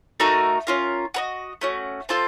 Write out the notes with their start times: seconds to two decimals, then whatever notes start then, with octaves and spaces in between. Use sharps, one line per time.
0.20 A3 D#4 F#4 A#4
0.67 C#4 F4 A#4
1.14 F#4 A#4 D#5
1.61 A3 C#4 F#4
2.09 C4 F4 A4